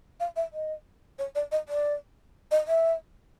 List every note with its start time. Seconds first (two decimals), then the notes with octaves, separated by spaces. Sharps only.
0.20 F5
0.36 E5
0.53 D#5
1.19 C#5
1.35 D5
1.52 D#5
1.69 D5
2.51 D#5
2.68 E5